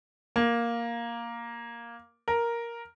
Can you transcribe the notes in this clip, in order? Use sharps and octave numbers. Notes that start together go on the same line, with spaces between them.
A#3
A#4